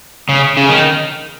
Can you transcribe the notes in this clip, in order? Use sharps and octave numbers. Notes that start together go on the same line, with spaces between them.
C#3
C#3
D#3